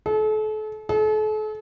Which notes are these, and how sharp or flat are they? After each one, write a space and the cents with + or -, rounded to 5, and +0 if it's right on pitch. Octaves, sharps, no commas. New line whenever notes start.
A4 -35
A4 -40